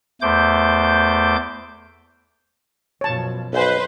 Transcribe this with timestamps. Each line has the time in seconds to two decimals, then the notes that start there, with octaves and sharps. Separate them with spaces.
0.21 E2 A3 C5 D6 G6
3.01 F#2 B2 F3 C#5 A5
3.53 B1 B4 C5 G#5